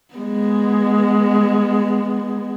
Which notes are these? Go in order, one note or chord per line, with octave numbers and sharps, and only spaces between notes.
G#3 B3